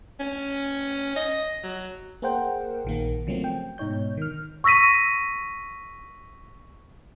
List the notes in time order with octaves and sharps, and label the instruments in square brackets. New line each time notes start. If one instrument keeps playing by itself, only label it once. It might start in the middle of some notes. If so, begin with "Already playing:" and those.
[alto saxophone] C#4
D#5
F#3
[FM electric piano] A#3 G#4 A#4 C5 F#5 G5
A#1 D#3 A#3
C#3 F3 F#3 A3 A#3 C4
G5
G#2 B2 D#4 C#5 G6
D#3 F6
[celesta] C#6 E6 A#6 B6 D#7